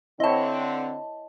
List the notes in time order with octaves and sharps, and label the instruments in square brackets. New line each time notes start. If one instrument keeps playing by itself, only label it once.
[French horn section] D3 C4 [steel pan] E4 C#5 [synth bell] D#5 A5